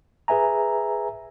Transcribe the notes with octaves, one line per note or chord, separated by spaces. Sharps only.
G#4 B4 E5 G#5 A#5